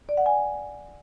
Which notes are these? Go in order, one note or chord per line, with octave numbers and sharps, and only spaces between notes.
D5
F#5
G#5